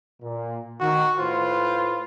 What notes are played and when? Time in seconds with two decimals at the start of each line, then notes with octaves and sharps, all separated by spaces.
0.22 A#2
0.80 D#3 F#4
1.18 A2 F4 B4 C5